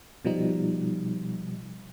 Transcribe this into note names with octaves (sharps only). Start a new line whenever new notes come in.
B2 F3 G3 D#4